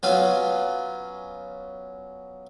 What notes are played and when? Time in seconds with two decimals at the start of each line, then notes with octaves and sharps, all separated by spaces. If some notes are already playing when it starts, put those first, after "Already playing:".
0.03 F#3 B3 C#4 F4